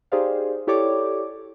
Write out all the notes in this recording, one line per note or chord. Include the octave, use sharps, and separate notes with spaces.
D#4 G4 G#4 C5 D5 F5
E4 G4 A4 C#5 D5 D6